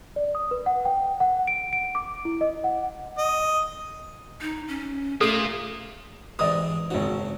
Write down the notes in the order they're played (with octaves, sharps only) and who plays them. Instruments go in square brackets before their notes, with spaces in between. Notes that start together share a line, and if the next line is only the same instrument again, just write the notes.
[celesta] D5
D#6
B4
F#5
G5
F#5
D7
D7
D6
E4
D#5
F#5
[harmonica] D#5
[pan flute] D#4
C#4
[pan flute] A3 [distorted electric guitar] A#3 F4 [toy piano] A4
[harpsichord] G#2 C3 E3 [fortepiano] D5 D#5 D#6
[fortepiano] G#1 F#4 [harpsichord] G#2 C#3